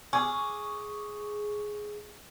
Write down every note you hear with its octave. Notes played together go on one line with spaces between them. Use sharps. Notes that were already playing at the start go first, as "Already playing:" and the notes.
G#4 C#6 D6